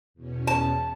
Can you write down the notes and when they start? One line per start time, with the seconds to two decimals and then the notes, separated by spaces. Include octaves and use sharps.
0.14 E2 B2 C#4
0.47 A5